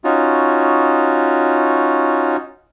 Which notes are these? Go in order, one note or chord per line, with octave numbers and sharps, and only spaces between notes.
C#4 D#4 F4 F#4